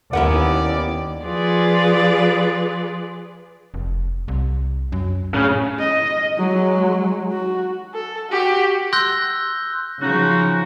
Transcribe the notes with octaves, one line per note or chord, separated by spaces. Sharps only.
D#2 D#3 B3 C#4 E4 A#4 D5 F#5
F3 F4 G#4 B4 D5
F1
C2
F#2
A2 C#3
D#5
F#3 G#3
F#4
A4
F#4 G4
C6 E6 F#6 G6 A#6 G7
C#3 F3 C#4 D#4 F#4